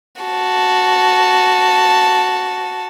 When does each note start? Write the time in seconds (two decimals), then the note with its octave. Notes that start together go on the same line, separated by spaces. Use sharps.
0.22 F#4 A5